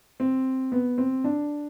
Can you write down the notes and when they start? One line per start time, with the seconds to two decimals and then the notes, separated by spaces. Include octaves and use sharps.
0.20 C4
0.72 B3
0.98 C4
1.24 D4